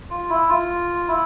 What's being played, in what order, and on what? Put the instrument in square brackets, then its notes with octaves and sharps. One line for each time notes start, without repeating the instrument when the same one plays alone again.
[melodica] F4
E4
F4
E4